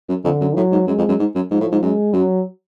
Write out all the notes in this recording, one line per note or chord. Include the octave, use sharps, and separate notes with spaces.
F#2
F2 D3
F#2
A2 F#3
G#2
F#2 G#3
F2
F#2
G#2
F#2
G#2 F3
A2
G#2
F#2 G#3
F#2 F#3